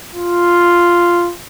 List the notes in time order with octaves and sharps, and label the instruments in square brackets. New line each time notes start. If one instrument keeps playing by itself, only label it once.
[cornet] F4